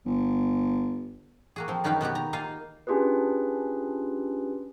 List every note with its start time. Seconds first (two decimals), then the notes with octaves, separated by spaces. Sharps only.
0.05 G1
1.56 A#3 F#4 G#4
1.68 F3 C4
1.84 F#2 D#3 F#4 B4 F5 G5
2.01 B2 B3 F#4 G4
2.15 A#5
2.33 A#3 D#4 F4 F5 G#5
2.87 C#4 D4 F4 G4 G#4 B4